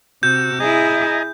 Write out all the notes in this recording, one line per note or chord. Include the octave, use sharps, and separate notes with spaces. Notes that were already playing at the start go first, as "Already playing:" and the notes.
C3 F#4 E6 G6
E4 G#4 D#5 G#5 A#5